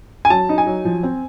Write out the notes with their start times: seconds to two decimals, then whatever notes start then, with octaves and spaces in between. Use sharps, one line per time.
0.25 G#5
0.30 F#3 A5
0.49 D#4
0.58 G#5
0.66 F#3
0.85 F3
1.03 C4